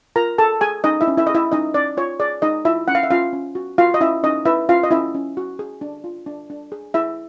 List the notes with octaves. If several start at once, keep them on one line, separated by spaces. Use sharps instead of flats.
F4 A#4 A#5
G#4 A4 A5
G#4 G#5
C#4 D#4 D#5
E4 E5
C#4
E4 E5
G#4 D#5
E4 E5
C#4 D#4 D#5
C#4 D5
F4 C#5
G#4 D5
D#4 G#4 D#5
E4 F4 E5
C#4 F#5
F5
E5
C#4 F4 F5
C#4
F#4
F4 F#4 F5
D#5
C#4 E4 E5
C#4 D#4 D#5
E4 B4 E5
C#4 F4 F5
D#5
C#4 E4 E5
C#4
F#4
G#4
D4
F4
D4
D4
G#4
E4 G#4 E5